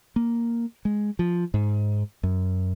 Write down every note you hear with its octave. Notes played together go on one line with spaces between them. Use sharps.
A#3
G#3
F3
G#2
F#2